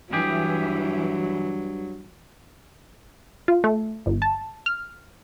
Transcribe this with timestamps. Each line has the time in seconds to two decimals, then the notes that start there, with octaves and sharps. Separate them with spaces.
0.13 G2 E3 F#3 G4 G#4
3.48 F4
3.64 A3
4.06 G1
4.22 A5
4.66 F6